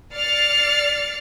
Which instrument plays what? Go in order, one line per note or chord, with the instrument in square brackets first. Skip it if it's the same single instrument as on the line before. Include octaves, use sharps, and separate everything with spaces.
[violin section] D5 F6 A6 C7 C#7